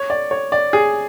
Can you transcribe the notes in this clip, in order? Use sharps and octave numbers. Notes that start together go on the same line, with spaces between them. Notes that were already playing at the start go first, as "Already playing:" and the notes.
Already playing: C#5
D5
C#5
D5
G#4